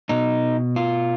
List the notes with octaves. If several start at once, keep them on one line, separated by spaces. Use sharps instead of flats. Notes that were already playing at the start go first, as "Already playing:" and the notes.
B2 D#4
F4